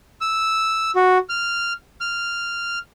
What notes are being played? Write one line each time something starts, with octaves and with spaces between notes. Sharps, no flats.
E6
F#4
F6
F6